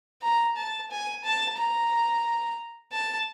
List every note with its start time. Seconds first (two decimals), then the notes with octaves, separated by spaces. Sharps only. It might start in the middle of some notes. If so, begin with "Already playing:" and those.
0.22 A#5
0.56 A5
0.91 G#5
1.24 A5
1.57 A#5
2.92 A5